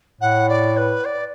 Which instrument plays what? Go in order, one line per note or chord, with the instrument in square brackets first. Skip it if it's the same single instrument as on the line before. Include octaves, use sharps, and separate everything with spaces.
[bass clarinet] A2 [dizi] F#5
[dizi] D5
B4
D5